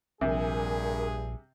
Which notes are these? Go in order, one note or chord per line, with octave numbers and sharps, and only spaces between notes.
A#1 G2 C3 G#4 A#4 G#5